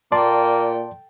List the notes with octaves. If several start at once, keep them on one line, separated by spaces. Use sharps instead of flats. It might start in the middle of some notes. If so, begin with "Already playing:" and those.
A#2 A#3 A4 D5 G5 A5 C6